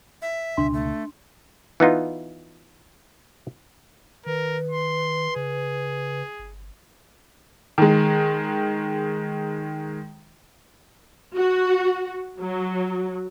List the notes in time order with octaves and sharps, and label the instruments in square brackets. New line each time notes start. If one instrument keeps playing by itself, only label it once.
[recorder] E5
[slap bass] C#2 B2 D3 [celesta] D4 C6
[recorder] A3
[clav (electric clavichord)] E3 B3 D#4 F4
[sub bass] D#3 [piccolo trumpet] A#4 [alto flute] B4
[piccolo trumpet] C6
[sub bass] C#3 [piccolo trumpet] G#4
[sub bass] G1
[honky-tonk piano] D#3 G#3
[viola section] F#4
F#3